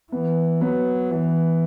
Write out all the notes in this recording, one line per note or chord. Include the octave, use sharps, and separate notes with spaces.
E3 B3
F#3 B3
E3